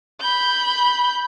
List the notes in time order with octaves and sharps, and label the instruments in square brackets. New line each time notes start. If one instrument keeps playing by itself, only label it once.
[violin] B5 G6